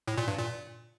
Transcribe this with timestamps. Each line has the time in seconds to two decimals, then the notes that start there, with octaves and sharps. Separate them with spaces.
0.08 A2
0.18 A#2
0.28 G2
0.38 A#2